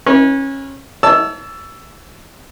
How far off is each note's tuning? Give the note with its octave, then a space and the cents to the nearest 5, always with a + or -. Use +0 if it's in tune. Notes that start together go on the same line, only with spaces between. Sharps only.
C#4 -25 B4 -45
C#5 +45 A5 +0 E6 +10